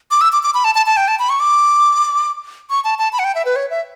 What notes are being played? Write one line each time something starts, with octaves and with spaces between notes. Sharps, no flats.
D6
E6
D6
D6
B5
A5
A5
A5
G5
A5
B5
C#6
D6
C#6
A5
A5
B5
F#5
G5
E5
B4
C#5
E5